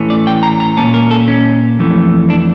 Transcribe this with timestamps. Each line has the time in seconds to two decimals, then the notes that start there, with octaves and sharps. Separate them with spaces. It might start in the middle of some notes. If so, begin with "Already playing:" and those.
Already playing: A2 E3 A3 C#4
0.10 D5
0.27 G5
0.43 A#5
0.60 A#5
0.77 A#2 F3 A#3 C#4 A5
0.94 A#4
1.11 A4
1.28 C#4
1.79 F2 E3 A3
2.30 D4